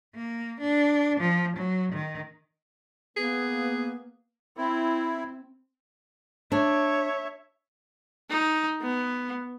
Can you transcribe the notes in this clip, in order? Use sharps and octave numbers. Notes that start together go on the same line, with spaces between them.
A#3
D4
F3
F#3
D#3
A#3 B3 G#4 B4
C4 E4
D4 C#5 E5
D#4
B3